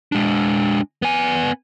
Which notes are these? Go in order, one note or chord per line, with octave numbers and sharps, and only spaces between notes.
G#3 D4
B3 G#5